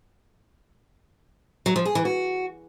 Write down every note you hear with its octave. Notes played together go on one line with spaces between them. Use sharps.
F#3
F3
G#4
E3
F#4